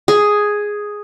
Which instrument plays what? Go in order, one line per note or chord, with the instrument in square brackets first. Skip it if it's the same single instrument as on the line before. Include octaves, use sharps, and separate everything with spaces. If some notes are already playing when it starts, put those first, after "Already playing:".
[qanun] G#4